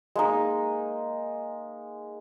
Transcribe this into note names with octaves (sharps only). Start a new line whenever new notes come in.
G#3 A#3 D#4